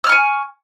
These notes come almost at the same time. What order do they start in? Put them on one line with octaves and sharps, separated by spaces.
E6 F6 C#6 G#5